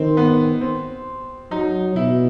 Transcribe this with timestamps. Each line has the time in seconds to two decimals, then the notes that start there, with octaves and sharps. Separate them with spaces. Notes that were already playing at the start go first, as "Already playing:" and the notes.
Already playing: D#3 C4
0.17 B3
0.61 C4
1.51 F#3 D#4
1.95 B2 E4